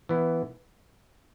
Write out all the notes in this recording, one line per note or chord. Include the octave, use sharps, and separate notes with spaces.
E3 B3 E4